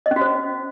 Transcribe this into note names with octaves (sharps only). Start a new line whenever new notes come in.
D#5
C#4
F#4
C5